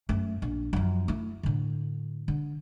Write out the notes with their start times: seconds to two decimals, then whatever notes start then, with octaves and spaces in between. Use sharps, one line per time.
0.09 F#2 A3
0.42 A#1
0.73 F#2 F3
1.08 A3 E4
1.43 A2 D3
2.28 D3